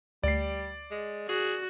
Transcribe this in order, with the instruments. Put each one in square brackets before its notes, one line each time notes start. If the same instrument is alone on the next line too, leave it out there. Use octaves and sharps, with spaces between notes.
[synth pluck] D2 [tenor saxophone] G3 [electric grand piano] D5 C7
[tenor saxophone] G#3
[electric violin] F#4 [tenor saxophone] G#4